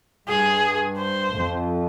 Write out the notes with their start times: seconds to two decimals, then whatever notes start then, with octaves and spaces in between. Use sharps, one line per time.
0.27 G2 G#4
0.98 C5
1.33 F2